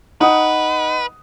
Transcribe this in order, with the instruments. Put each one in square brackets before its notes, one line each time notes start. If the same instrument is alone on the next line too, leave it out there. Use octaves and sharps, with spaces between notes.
[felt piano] D#4 [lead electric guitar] B4 [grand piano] F#5 D#6